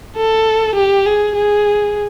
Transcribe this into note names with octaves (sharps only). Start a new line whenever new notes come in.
A4
G4
G#4
G#4